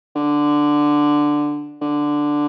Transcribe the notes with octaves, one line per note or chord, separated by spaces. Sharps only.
D3
D3